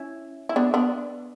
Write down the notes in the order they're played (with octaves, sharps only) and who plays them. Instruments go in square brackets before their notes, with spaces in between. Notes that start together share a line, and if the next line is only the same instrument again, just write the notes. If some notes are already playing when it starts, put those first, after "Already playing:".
Already playing: [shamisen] C#4 E4
E4
B3 D4
B3 D4